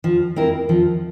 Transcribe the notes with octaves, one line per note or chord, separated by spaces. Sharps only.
F3
C4 E4 A#4
F3